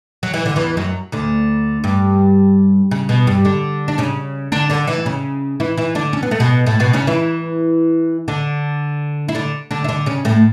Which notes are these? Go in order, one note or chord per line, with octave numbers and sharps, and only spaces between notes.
F#3
E3
D3
E2 E3
F#2 F#3
D2 D3
G2
C#3
B2
G2 G3
D3 D4
D4
C#3 C#4
D3 D4
D3 D4
E3 E4
C#3 C#4
E3 E4
E3 E4
D3 D4
C#4
B3
A3
B2 B3
A2 A3
B2 B3
C#3 C#4
E3 E4
D3 D4
E4
D3 D4
D3 D4
E4
D3 D4
C#3 C#4
A2 A3